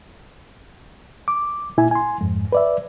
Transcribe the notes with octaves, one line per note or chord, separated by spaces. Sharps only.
D6
A#2 E4 G#5
G#5 C6
F2 G#2
B4 D5 E5